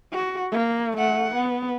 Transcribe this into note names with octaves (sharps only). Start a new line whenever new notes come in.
F#4
A#3
A3 F#5
B3